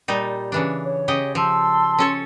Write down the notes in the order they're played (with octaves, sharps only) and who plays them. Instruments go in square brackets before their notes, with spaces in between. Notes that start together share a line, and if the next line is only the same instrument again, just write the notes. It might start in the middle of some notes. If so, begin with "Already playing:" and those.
[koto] A#2 G3 D#4
C#3 E3 D4
[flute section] C#5
[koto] C#3 G4 D#5
[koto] F3 [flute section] A5 C6 E6
[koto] C#4 A4 C#5